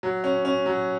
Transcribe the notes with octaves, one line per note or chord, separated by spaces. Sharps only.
F#3
C#4
C#4
F#3